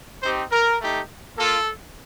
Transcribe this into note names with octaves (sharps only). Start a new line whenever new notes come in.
C4 D#4 G4 C5
A#4
A3 D#4 G4
A#3 F4 A4